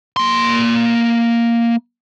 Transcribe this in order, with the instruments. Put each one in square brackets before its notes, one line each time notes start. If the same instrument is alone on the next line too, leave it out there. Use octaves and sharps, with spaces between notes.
[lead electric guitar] A#3 C6